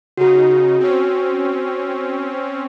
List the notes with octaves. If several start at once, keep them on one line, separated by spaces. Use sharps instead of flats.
C#3 D#4 F#4
C4 C#4